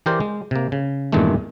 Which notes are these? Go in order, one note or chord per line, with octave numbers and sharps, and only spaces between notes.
E3 G4 A#4 C5 D5
G#3
C3 A#3
C#3
E2 G2 A#2 D#3 G#3 A3